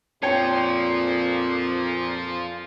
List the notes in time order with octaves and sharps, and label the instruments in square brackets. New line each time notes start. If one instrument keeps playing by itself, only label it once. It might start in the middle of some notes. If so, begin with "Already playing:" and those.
[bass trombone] F2 [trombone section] A#2 [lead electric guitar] F4 C5 [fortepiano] C#5 G5